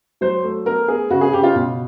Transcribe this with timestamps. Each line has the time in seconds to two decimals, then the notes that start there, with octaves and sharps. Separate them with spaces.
0.21 F#3 C5
0.44 A3
0.66 B3 A#4
0.88 B3 G#4
1.10 C#3 F#4
1.21 G#4
1.33 C#3 G4
1.43 F4
1.55 B2